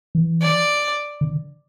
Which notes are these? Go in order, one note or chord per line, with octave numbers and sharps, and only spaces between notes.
E3
D5
D3